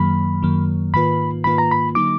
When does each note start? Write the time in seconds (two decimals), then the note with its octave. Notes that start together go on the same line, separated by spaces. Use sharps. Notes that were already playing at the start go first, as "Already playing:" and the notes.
Already playing: F#2 D#3 F#3 A#3 B5
0.42 F#2 D#3 F#3 A#3
0.94 G#2 D#3 A#3 F4 B4 B5
1.44 G#2 D#3 A#3 F4 B4 B5
1.58 A#5
1.71 B5
1.95 D3 F#3 A#3 D#4 D6